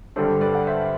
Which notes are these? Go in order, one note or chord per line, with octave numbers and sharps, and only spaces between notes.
G2 D3 G3 D4 A4 C5
B4 D5
F#5
C5 E5